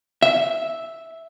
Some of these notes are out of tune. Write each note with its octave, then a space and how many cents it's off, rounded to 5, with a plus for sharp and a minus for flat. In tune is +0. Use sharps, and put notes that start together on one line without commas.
E5 -5